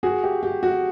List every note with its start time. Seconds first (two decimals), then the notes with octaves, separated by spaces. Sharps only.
0.03 F#4 G#4
0.24 G4
0.43 G4
0.63 F#4